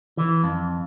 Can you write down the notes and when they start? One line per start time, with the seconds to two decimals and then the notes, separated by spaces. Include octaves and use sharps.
0.17 E3
0.44 F2